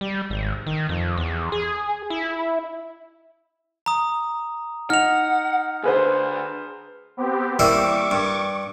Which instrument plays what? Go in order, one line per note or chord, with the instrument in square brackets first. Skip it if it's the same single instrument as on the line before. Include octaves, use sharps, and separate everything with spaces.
[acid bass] G3
G#1
D#3
F2
E2
G#4
E4
[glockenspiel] A#5 D#6
[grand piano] D#4 [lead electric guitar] F#5 [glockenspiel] F6 F7
[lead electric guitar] D2 D3 [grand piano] G#4 B4 C5
[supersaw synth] B3 C4 G4
[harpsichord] G3 A#3 E4 [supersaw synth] C#6 D6
[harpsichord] G2